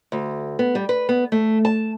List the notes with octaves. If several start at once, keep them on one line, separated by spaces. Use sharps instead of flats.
D2
B3
G3
B4
B3
A3
A5